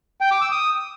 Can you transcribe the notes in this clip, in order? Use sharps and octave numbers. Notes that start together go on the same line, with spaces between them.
G5
D6
E6
D#6